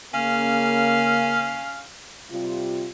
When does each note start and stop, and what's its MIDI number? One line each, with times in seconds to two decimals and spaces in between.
0.14 1.64 49
0.14 1.64 58
0.14 1.84 61
0.14 1.84 77
2.31 2.89 48
2.31 2.89 55
2.31 2.89 65